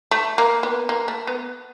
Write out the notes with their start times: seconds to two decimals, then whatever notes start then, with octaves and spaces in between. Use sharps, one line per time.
0.11 A3
0.38 A#3
0.63 B3
0.89 A#3
1.08 A3
1.27 B3